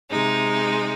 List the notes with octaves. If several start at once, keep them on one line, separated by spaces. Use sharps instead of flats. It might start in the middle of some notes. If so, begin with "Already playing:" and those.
C3 G#3 D#4